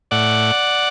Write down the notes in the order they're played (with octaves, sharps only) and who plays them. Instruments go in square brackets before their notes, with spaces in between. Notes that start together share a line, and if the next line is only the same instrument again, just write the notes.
[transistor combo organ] A2 D5 F#5